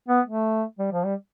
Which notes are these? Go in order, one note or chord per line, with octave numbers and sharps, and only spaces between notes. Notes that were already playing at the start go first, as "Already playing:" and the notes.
B3
A3
G3
F3
G3